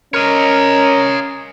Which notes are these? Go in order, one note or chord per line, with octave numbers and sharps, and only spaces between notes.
C#4 A#4 C#5 D#5